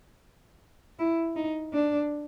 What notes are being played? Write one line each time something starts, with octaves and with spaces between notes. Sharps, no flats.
E4
D#4
D4